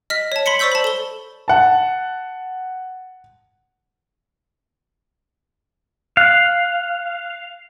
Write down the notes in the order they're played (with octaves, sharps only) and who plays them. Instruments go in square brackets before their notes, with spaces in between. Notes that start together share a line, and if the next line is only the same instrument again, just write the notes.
[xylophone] D#5 F6 B6
C#5 A5
B5 C6 B6 C#7
C5 D5 C#6 E6 G6 B6
A5 B5
A4 G7
[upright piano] F#5 A5
[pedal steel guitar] F5 [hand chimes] F#6